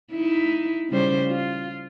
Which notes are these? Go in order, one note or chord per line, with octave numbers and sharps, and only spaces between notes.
D#4 E4
C#3 G3 C5
F4